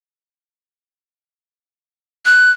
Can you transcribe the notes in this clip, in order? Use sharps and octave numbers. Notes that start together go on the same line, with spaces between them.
F#6